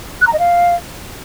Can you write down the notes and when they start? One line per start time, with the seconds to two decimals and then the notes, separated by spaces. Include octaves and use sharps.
0.21 F#6
0.27 A#5
0.33 D#5
0.39 F5